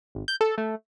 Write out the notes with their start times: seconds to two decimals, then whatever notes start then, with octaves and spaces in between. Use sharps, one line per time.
0.15 G#1
0.28 G6
0.41 A4
0.58 A3